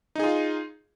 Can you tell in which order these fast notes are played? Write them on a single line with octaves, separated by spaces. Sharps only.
D#4 G#4 F4